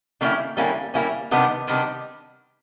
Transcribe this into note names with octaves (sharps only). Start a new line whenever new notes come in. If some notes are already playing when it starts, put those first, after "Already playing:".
D3 G3 A#3 C#4 E4
D3 G3 A#3 C#4 E4
D3 G3 A#3 C#4 E4
C3 D#3 G3 B3 D4
C3 D#3 G3 B3 D4